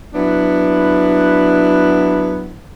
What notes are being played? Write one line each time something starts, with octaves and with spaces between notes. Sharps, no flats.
F#3 B3 D4 E4